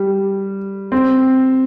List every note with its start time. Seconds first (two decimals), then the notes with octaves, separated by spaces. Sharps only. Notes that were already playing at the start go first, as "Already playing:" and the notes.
Already playing: G3
0.92 C4